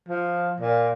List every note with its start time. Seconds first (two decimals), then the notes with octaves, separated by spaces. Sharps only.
0.08 F3
0.60 A#2